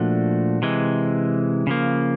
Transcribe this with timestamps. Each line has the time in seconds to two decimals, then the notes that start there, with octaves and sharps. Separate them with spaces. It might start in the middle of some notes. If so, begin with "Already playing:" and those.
Already playing: A#2 F3 A3 D4 F#4
0.62 C3 E3 G#3
1.67 C#3 F3 A#3